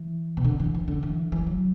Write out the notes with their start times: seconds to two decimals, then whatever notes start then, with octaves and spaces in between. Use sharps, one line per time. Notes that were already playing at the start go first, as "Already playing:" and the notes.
Already playing: E3
0.37 B2
0.44 D3
0.60 E3
0.74 E3
0.88 D3
1.03 E3
1.32 E3
1.47 F#3